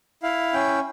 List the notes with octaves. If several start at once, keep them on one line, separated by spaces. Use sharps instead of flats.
E4 F5
C#4 G5